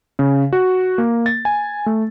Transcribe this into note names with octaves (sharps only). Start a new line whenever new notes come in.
C#3
F#4
A#3
A6
G#5
A3